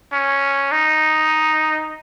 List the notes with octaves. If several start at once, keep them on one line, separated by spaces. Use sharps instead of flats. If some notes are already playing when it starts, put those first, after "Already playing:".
C#4
D#4